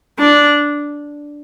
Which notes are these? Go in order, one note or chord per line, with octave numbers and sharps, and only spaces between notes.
D4